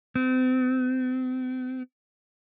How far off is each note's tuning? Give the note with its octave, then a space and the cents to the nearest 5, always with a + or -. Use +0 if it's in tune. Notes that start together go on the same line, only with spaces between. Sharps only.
C4 -35